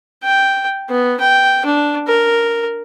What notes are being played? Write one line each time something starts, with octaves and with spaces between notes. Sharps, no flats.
G5
B3
G5
D4
A#4